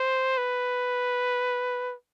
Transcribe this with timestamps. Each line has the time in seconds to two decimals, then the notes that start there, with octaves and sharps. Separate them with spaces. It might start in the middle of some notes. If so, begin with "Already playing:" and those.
Already playing: C5
0.37 B4